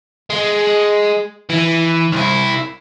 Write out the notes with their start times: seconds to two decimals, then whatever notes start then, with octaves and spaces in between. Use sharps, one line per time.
0.30 G#3
1.49 E3
2.12 C2 E4